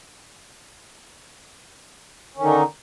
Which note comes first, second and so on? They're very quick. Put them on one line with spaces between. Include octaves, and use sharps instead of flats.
C#4 D#3 D3 D#4